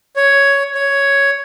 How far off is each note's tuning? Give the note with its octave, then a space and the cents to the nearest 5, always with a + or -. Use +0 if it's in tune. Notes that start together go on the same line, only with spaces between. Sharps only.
C#5 +5
C#5 +5